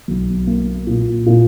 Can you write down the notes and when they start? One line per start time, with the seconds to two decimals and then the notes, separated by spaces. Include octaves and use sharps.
0.08 B1
0.47 A#3
0.87 A#2
1.26 A#2